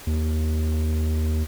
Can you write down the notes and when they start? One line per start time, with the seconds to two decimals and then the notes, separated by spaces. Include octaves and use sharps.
0.07 D#2